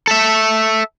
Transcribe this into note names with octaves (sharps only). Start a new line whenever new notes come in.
A4 E5